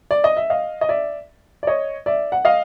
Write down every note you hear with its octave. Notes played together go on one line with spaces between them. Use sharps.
D5
D#5
E5
D#5 F5
D#5
D5 E5
D5
C#5 D#5
D5 E5
F#5
D#5 F5